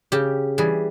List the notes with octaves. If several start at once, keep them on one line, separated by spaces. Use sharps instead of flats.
C#3 G4
E3 G3 G#4